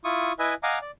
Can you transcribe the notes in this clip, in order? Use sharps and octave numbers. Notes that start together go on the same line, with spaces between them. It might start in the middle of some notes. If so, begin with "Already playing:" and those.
E4 F4 C#6 D#6
E4 B4 D#5 E5 G#5
D#5 F5 F#5 G#5 A#5 D6
D5